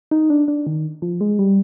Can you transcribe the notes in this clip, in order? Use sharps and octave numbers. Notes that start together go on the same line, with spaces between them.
D#4
D4
D4
D#3
F3
G#3
G3